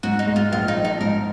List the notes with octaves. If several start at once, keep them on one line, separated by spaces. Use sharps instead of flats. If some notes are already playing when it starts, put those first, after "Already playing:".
G#2 F#4
D#4
G#3
F4
A#1 F4
D#4
F3
D#4
G#2 A#4